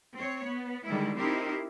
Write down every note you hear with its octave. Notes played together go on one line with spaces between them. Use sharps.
C4 C#5
B3
D3 D#3 G3 G#3 E4
C4 D#4 E4 G4 A#4 C5